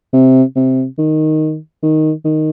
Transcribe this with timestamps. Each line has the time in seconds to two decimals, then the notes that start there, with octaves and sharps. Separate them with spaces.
0.13 C3
0.56 C3
0.98 D#3
1.82 D#3
2.25 D#3